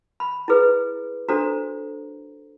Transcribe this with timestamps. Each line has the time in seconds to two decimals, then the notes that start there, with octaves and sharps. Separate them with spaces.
0.20 B5
0.48 E4 G#4 B4
1.29 D4 F#4 A4 C5 A#5